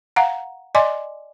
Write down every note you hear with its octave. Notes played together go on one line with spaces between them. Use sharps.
F5 F#5 A#5
D5 D#5 G#5 C6 D6